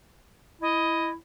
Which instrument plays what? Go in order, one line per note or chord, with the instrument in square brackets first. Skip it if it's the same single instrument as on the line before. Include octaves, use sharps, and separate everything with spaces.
[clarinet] E4 [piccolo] D#5